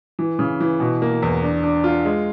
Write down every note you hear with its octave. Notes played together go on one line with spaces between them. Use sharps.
E3
C#3
E3
B2
A#3
E2
D4
D4
F4
G#3